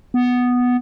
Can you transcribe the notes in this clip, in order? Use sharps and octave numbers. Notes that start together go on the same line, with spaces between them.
B3